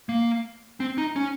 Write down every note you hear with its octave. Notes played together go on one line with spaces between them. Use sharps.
A#3
C4
D#4
C#4